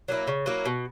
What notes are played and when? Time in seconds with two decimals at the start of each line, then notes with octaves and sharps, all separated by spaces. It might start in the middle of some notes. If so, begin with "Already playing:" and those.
0.08 F#3 A#3 E4
0.27 C#3
0.46 F#3 A#3 E4
0.65 B2